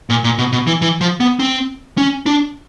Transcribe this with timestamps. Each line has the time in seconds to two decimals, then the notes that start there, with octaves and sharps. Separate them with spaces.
0.10 A#2
0.24 A#2
0.38 B2
0.52 B2
0.67 E3
0.82 E3
1.01 F3
1.20 B3
1.40 C4
1.98 C#4
2.26 D4